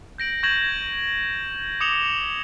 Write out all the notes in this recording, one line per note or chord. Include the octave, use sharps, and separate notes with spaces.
G6 A#6 D7 F#7
C#6 G6 G#6 A#6 E7 F#7
D6 D#6 C#7 E7 F7 G7